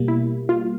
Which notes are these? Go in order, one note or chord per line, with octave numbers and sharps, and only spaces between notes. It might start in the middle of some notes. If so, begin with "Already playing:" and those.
Already playing: B2 G3 A#3
E4
F4